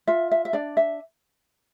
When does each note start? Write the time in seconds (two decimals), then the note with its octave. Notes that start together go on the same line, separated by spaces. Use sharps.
0.07 F4 E5
0.31 E5
0.45 E5
0.53 D4 D5
0.77 E5